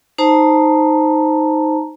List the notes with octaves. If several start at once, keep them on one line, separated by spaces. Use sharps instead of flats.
D#4 C5 A5 A#5